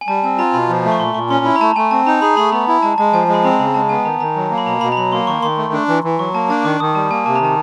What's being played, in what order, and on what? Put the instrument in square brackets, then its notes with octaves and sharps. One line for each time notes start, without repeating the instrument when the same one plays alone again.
[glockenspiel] G#5
[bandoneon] G3 [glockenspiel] A5
[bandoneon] C4 [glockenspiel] G#5
[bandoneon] F4 [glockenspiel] A#5
[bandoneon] B2 [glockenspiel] B5
[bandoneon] F3
A3
[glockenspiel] C#6
[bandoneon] A#2 [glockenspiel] C6
[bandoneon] A#2 [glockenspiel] C#6
[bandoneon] C#4 [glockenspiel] C6
[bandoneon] E4 [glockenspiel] B5
[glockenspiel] A#5
[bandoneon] A3 [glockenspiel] A5
[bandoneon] A3 [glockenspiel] G#5
[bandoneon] C4 [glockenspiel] A5
[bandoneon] D#4 [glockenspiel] A#5
[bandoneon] G#4 [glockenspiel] B5
[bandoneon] A3 [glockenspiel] B5
[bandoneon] B3 [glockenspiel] A#5
[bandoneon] E4
[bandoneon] G#3 [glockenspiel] A5
[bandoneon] G#3 [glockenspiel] A5
[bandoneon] F3 [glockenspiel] G#5
[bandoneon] G#3
[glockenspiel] B5
[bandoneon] C4 [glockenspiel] A#5
[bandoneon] C#3 [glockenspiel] B5
[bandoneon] G#3 [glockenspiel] A5
[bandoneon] B3 [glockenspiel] G#5
[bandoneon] D#3 [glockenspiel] A#5
[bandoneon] D#3 [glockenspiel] A#5
[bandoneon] F#3
A#3
[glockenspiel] B5
[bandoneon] B2 [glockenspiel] A#5
[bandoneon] B2 [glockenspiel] B5
[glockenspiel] A#5
[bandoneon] F#3 [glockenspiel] B5
[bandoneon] A#3 [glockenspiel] C6
[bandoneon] D#3 [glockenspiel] C#6
[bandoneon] D#3 [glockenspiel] C6
[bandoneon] A3
D4
E3
E3
[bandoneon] F#3 [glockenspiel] C#6
[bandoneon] A#3 [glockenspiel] A5
[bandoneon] D4 [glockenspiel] A5
[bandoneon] D#3 [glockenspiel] D6
[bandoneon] D#3 [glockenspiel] D#6
[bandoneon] G3 [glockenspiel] A5
[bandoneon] A#3 [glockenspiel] G#5
[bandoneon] C3 [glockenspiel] A5
[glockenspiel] A#5
[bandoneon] D#3 [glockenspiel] A5